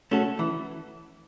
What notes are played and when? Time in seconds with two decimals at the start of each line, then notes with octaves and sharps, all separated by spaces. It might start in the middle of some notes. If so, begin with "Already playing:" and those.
0.11 A3 C#4 F#4 A4
0.39 E3